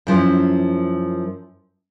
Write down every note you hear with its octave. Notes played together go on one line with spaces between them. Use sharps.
F#2 F3 E4